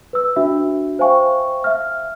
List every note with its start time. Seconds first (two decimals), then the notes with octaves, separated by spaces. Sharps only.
0.13 B4 E6
0.36 D4 F#4 E5
0.99 C5 E5 F5 G5 G#5 C#6
1.64 E5 F6